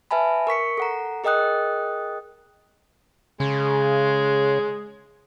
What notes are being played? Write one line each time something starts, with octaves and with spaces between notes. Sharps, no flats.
B4 E5 G#5 A5 B5
A#4 C#6 B6 C#7
A4 F#5 A#5
G#4 A#4 D#5 G5 D#6 F#6
C#3 G#3